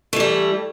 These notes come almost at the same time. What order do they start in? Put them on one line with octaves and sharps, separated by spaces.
A3 E3 G3